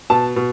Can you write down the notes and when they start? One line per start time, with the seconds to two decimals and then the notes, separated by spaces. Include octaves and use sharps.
0.10 B2 A5
0.36 B2